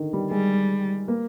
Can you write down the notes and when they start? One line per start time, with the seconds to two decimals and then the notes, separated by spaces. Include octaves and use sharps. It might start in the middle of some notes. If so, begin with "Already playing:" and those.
Already playing: D3 D#3
0.13 G3
0.31 G3 G#3
1.08 A#3